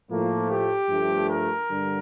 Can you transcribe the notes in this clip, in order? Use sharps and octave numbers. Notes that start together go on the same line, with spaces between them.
A2 F3 A3 A#3
G4
G2 F3 A3
A#4
G2 D3 G3